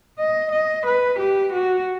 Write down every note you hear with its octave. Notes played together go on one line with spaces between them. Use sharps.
D#5
D#5
B4
G4
F#4